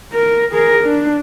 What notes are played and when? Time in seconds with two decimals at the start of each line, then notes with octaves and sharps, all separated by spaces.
0.13 A#4
0.52 G#4 A#4
0.84 D4